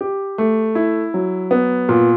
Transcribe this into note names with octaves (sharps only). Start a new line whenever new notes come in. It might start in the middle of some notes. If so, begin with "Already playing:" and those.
G4
A3
E4
F#3
B3
A#2